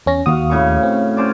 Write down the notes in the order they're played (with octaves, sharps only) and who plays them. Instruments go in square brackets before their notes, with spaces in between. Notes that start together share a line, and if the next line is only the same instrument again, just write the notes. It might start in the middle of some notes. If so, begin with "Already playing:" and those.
[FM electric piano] E2 C#4 A#6
[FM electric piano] D#2 D#6 [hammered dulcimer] F#4 F5
[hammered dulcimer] A2 C#3 C#6
[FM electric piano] C4
[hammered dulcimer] C#4 C5 D5